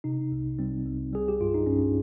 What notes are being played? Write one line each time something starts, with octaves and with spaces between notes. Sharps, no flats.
C3 D#4
C2
G3 C4
C2
G3 G#4
G4
G2 F4
D#4
G2 C#4